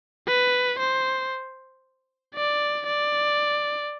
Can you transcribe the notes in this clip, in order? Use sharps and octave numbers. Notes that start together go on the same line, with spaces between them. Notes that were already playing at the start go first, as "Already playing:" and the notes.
B4
C5
D5
D5